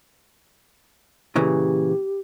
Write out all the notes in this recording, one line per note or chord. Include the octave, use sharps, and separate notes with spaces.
A#2 C#3 E3 G4